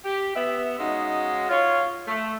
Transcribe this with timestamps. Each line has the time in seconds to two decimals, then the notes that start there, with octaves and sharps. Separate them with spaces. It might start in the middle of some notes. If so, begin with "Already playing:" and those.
0.04 G4
0.35 B3 E5
0.78 C#3 G#3 D#4 F#4
1.49 F4 C#5
2.07 A3